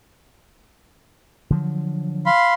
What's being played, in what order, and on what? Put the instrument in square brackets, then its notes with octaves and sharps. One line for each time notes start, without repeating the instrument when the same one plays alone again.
[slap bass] D3 F3 F#3
[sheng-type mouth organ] F5 B5 C6